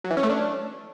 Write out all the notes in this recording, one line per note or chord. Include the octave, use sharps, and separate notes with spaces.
F#3
E3
C#4
A3
D4